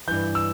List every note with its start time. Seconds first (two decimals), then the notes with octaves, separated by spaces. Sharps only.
0.07 G2 E3 G6
0.35 E6